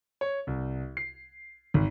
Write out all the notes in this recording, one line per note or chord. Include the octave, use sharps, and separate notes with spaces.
C#5
C2
C7
G#1